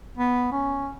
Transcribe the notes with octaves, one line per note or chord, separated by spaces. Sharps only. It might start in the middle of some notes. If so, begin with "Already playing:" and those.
B3
C#4